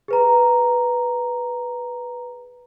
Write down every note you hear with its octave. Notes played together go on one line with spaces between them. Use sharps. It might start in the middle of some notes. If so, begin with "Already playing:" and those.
G#4 B4 A#5